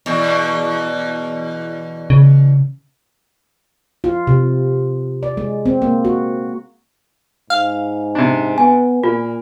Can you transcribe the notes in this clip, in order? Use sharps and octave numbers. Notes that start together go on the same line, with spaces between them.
E2 B2
C#3
F4
C3
D5
G#3
C4
A#3
F#4
G#2 F5
C3 D4
B3 G#5
A#2 A#3 F4